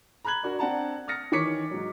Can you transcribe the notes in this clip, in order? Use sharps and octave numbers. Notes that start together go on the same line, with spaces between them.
A#5 B5 F#6 G#6 F#7
D4 F#4 A#4
C4 D4 F#5 A5 A#5
D#6 F6 A6 A#6 C#7
D#3 E3 C#5 D6 B6 C#7
G#2 F#3